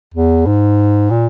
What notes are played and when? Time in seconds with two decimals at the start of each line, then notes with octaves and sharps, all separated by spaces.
0.14 E2
0.46 G#2
1.10 A#2